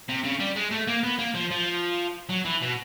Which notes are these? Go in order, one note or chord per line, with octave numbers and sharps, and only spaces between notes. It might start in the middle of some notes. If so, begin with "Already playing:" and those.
C3
C#3
G3
G#3
A3
A#3
B3
A#3
F3
F3
F#3
E3
B2